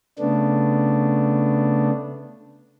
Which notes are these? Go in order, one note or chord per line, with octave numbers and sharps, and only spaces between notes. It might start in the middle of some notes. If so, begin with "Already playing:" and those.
C#3 A3 B3 D4